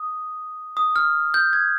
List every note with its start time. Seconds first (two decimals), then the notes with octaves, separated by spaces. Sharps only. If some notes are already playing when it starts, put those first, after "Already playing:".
Already playing: D#6
0.77 D#6
0.96 F6
1.34 G6
1.53 G#6